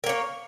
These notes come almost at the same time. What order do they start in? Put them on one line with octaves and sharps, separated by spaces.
A#4 A#3 C#5